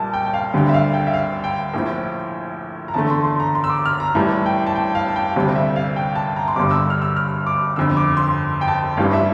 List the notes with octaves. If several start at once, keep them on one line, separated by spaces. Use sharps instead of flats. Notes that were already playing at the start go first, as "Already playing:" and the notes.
Already playing: A#1 A#2 G3 A5
G5
G5
F5
D2 D3 G3
E5
F5
G5
E5
F5
G5
A#1 A2 F3
A#5
E2 D3 A3 A5
C6
C6
A#5
C6
E6
D6
F6
A#5
A1 A2 E3 G3 A5
G5
A5
G5
F5
A5
G5
D2 C3 G3 F5
E5
F5
G5
A5
A#5
C6
G1 G2 D3 G3 D6
E6
F6
E6
F6
D6
G1 F2 D3 E6
D6
C6
G5
A5
A1 G2 E3 G3 F5
E5